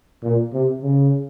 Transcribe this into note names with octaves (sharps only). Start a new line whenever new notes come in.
A#2
C3
C#3